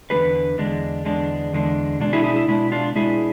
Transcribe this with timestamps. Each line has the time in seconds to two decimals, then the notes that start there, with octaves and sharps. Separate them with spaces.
0.10 E2 D3 G#3 D4 G#4 B4
0.58 E2 D3 G#3 D4
1.05 E2 D3 G#3 D4
1.52 E2 D3 G#3 D4
2.00 B2 G#3 D4
2.13 E4 G#4
2.24 E4 G#4
2.36 E4
2.48 B2 G#3 D4 E4
2.72 D4 F4
2.95 B2 G#3 D4 E4 G#4